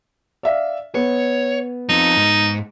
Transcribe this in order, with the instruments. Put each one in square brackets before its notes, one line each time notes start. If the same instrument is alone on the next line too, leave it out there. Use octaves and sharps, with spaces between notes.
[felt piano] D5 E5 F5
[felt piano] B3 [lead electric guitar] C#5
[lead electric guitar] F3 C4 [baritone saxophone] D#4
[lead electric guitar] G#2